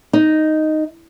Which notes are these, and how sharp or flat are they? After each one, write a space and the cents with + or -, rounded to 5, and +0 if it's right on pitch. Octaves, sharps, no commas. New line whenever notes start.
D#4 +0